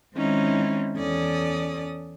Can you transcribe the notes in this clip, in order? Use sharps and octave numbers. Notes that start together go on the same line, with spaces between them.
D#3 G#3 C4 C#4 D#4 E4
E2 C#4 A4 D5 D#6